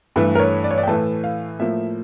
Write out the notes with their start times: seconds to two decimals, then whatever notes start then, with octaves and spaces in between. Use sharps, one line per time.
0.16 G2 E3 A3 A4
0.35 A#4
0.40 C#5
0.64 D5
0.71 C#5
0.78 D5
0.83 G5
0.87 A2 E3 A3 A5
1.24 F5
1.59 A2 F3 A#3 E5